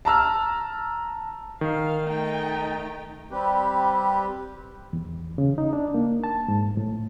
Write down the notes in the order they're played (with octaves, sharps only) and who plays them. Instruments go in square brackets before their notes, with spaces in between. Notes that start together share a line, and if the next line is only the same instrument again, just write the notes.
[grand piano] A5 A#5 E6 F6
[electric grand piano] D#3 [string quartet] F5
[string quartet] A3 D#4 G5
[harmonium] G3 C4 G4 B4
[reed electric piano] E2
C#3
D#4
D4
A#3
A5
G#2
A2